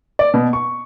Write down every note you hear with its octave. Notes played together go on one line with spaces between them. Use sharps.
D5
B2
C#6